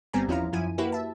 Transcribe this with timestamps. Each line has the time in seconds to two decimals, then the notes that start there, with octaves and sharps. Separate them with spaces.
0.13 G1 G3 B3 C4 G#5 A#5
0.28 E2 F3 C#4 E4 F5 A#5
0.53 F#2 F3 E4 G#5 D#7
0.78 A#3 E4 F#4 G4 B4
0.92 E5 A5